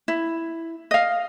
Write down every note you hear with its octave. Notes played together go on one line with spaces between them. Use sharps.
E4
D#5 F5